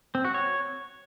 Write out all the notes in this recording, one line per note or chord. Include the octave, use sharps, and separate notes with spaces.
C4
F#4
C#5